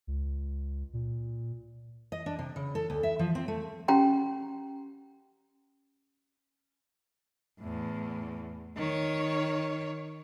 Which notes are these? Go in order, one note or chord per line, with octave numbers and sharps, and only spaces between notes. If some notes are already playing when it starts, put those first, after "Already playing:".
C#2
A#2
D#5
D4
C3
C#3
A4
D2
E5
F3
C4
A3
C#4 G4 F#5 G5 A#5 C6
E2 A2
D#3 C#5